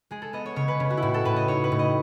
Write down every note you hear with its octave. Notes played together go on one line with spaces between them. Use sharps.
G#3 G#4
A4
B3 D#5
C#5
C#3 C#5
B4
C#3
F#4
E4
A2 F#4
A4
A2 B4
D#5
D#4 C#5
B4
A2
D#5